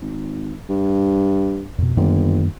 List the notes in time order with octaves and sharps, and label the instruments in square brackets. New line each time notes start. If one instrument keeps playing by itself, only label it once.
[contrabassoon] G#1
G2
[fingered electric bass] F2 B2
[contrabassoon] G1 [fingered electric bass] F#2 D#3 A#3